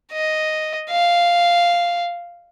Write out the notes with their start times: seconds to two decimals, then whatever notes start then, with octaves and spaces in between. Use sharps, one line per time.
0.12 D#5
0.91 F5